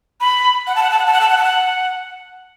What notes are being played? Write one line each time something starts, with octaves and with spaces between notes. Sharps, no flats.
B5
F#5
A5
F#5
A5
F#5
A5
F#5
A5
F#5
A5
F#5